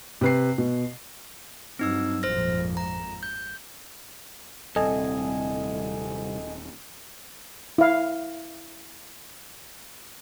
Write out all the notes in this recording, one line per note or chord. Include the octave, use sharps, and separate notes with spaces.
C3 B4 C7
B2
G2 F#3 C4 D#4 E6
G#1 F2 A#2 C5 F6 A#6
A#5
G6
D#1 C2 C4 A4 D#5 G#5
E4 F5